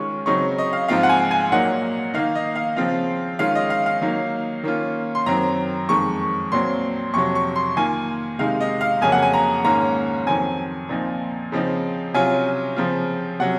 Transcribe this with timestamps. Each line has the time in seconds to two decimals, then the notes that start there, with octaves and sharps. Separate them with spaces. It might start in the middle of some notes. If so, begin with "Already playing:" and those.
Already playing: D#3 G#3 C#4 F4 C#6
0.26 C#3 F#3 C4 D#4 C#6
0.58 D#5
0.73 F5
0.88 G#2 F3 C4 F4 F5
1.03 F#5
1.09 G#5
1.31 G#5
1.52 A#2 F#3 A#3 D#4 F#5
2.14 D#3 A#3 D#4 F5
2.35 D#5
2.56 F5
2.76 C#3 F3 C4 F4 F5
3.39 D#3 G#3 C#4 F4 F5
3.55 D#5
3.70 F5
3.86 F5
4.01 D#3 F#3 A#3 D#4
4.63 D#3 A#3 C#4 F4
5.15 C6
5.26 F#2 D#3 F#3 C4 A#5
5.89 F2 D#3 G#3 C#6
6.52 A#2 F#3 C4 C6
7.14 F2 C3 F#3 C#6
7.35 C#6
7.56 C6
7.77 D#3 A#3 F4 G#5
8.39 C3 D#3 G#3 D#4 F5
8.60 D#5
8.81 F5
9.01 F2 C#3 F#3 A#3 G#5
9.12 F#5
9.22 G#5
9.34 A#5
9.64 G#2 D#3 A#3 C#4 A#5
10.26 F2 D#3 F#3 C4 G#5
10.89 A#2 F3 C4 D#4
11.52 C#3 F3 C4 D#4
12.14 C3 F#3 C#4 F4 G#5
12.76 C#3 F3 C4 F4
13.40 C3 F#3 C#4 F#5